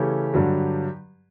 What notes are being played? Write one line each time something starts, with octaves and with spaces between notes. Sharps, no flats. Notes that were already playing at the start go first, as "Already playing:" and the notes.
Already playing: C#3 E3 A3 C#4 G4
G2 D3 F#3